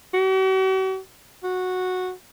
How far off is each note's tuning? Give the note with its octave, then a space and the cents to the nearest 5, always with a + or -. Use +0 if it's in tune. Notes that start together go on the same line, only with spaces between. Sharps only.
F#4 +45
F#4 -10